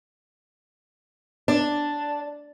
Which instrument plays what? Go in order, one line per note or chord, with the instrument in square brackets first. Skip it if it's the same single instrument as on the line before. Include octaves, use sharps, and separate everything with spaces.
[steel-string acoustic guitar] D4